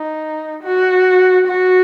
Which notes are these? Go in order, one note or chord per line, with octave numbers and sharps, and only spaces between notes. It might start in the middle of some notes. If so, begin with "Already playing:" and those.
Already playing: D#4
F#4
F#4